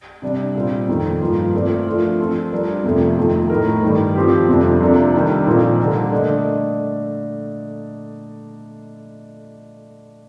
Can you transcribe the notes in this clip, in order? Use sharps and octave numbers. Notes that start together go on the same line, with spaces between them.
C3 G3 D4
A#2 G3 C4
F2 D#3 A#3
G2 F3 A#3 F4
A3 C4 F4 A#4 D5
F3 A3 D4 F4
F3 C4 F4 A4
G3 D4 F4 A#4
F2 C3 F3 A3
F2 D#3 A3
A2 A3 D#4 A#4
G2 D#3 G3
F3 C4 G4
F2 C3 G3 D4
C3 F3 A#3 D4 A4
D#3 G3 D4
A#2 F3 C4 D#4 A4
D3 G3 A#3
A3 D4 A4 D#5